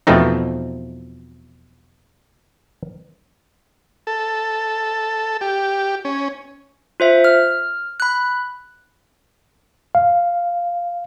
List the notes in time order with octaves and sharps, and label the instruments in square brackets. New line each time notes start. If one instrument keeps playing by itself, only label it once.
[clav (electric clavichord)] E2 B2 F3 A3 C4 D#4
[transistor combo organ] A4
G4
C#4
[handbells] F4 C5 E5
F6
B5 F#6
[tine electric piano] F5